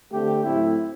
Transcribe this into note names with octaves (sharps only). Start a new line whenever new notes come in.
D3 A3 C4 G4
A2 F#3 A3 C4 E4